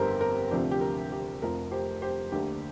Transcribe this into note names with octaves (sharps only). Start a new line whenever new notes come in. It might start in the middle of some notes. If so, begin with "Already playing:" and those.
Already playing: G1 F2 D3 G4 A#4 C5
A#4
D2 C3 F3 D4 G4
G4
A#4
G4
F1 F2 F3 A#4
G4 C5
G4 C5
D2 D3 A#3 D4 G4